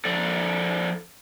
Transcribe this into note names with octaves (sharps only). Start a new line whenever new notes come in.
F3 A4 D5